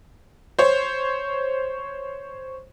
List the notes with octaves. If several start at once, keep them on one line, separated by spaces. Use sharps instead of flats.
C5 C#5